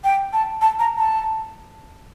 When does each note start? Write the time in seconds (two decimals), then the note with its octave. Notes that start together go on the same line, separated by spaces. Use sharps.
0.04 G5
0.33 A5
0.61 A5
0.79 A#5
0.98 A5